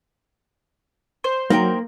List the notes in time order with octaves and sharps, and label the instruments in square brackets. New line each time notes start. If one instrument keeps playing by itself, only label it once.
[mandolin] C5
[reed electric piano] F#3 [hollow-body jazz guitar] A#3 [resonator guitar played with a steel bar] D#4 A#4 G5